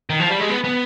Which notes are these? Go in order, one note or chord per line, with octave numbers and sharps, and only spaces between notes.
D#3
F3
G3
G#3
B3
B3